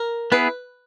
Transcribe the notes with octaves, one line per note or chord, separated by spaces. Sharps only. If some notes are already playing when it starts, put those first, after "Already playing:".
Already playing: A#4
B3 E4 G#4 B4